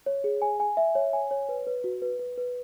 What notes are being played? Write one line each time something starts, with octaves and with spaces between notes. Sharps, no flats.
C#5
G#4
G#5
G#5
E5
C#5
G#5
C#5
B4
B4
F#4
B4
B4
B4